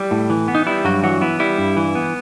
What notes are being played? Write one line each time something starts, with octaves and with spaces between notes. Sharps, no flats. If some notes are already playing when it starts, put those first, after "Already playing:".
Already playing: G3 E4
A2
E3
B3
D#4
G3 E4
G2 F#3 F#4
E3 F#3 F#4
B3 E4
G3 E4
G2
E3
B3